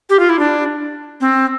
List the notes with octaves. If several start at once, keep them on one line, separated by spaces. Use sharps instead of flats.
G4
F4
E4
D4
C4